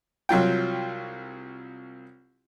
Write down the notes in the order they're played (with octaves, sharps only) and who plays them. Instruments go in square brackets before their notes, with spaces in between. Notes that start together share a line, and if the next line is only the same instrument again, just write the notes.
[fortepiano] C2 F#3 F4 G5